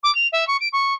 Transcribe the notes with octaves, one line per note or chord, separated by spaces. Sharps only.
D6
F7
E5
C#6
D7
C#6